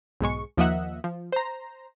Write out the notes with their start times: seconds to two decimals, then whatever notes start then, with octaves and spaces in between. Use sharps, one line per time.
0.21 B1 G#2 G#3 C#6
0.57 D#2 F3 A#3 D#5 E5 F#5
1.04 F3
1.32 C5 A#5